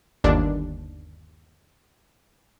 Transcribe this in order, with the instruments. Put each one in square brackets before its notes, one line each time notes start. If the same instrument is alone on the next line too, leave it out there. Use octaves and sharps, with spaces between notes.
[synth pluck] G1 D#2 D4